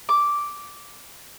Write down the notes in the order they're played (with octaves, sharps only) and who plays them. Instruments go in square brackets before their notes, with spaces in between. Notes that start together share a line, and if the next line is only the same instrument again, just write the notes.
[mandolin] D6